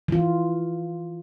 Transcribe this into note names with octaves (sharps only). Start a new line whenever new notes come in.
E3 F4